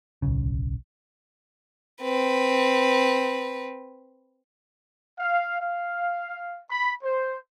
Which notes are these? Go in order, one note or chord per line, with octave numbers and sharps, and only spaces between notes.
D1 B1 C#3
C4 B4
F5
F5
B5
C5